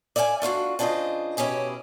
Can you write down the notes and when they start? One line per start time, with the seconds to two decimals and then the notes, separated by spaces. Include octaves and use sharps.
0.16 D5 E5 F5 G5 G#5
0.42 A3 D4 F4 F#4
0.79 C#3 D4 F4 G#4 C5 D#5
1.37 B2 C#4 E4 G4 G#4